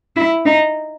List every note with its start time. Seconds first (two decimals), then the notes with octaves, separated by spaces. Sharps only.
0.16 E4
0.46 D#4